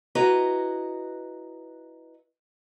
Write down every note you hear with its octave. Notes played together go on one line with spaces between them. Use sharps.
E4 F#4 B4 D#5 A#5